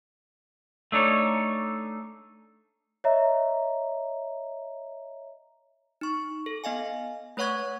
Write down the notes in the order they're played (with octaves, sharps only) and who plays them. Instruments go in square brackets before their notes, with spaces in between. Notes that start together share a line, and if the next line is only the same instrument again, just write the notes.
[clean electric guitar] A3 D4 D#4 C#5
[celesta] C#5 D#5 E5 A#5
[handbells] D#4 C#6
A4
B3 D#5 F5 G#5
A3 B4 C#5 F#5 C#6 G#6